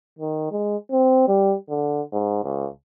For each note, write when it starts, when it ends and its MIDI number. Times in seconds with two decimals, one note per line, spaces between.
0.19 0.47 51
0.51 0.76 56
0.91 1.27 60
1.28 1.54 55
1.70 2.02 50
2.13 2.43 44
2.44 2.68 37